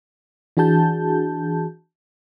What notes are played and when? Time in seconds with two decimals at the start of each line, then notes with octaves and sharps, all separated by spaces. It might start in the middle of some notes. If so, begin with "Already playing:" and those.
0.57 E3 D4 F#4 G#4 A5 G6